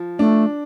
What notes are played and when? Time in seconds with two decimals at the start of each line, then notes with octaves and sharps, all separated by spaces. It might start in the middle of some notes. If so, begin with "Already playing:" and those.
Already playing: F3
0.19 A3 D4